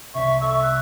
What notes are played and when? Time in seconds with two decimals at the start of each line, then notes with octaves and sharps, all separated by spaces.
0.14 C2 C3 E5 C#6
0.41 A4 E5
0.62 F#6